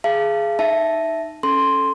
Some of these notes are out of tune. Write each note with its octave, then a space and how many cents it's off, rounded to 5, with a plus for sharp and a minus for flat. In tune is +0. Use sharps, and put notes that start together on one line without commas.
G#4 +10 F5 -35 A5 +5
D#4 -10 E5 +0 A5 -5
C#4 +0 A4 +0 C6 +0